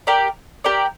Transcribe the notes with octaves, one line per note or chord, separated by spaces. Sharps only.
G4 A#4 D5
G4 A#4 D5